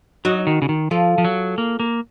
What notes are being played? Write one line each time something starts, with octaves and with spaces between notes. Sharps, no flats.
F#3 D#4 F#4
D#3
C#3
D#3
F3 F4 A4
F3
F#3
A#3
A#3